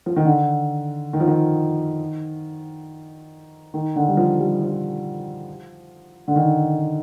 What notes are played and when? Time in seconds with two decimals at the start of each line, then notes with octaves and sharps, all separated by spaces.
0.06 F3
0.16 D#3
0.25 D3
1.13 D#3
1.20 F3
1.28 D#3
3.74 D#3
3.96 D3
4.08 G3
4.17 F3
4.39 G3
4.62 F3
6.28 D3
6.36 D#3